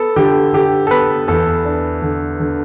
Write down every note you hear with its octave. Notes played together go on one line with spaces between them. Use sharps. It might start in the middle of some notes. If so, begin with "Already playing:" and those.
Already playing: B3 A4
D3 G4
D3 G4
A4
B3 B4
E2 A4
D4
D3
D3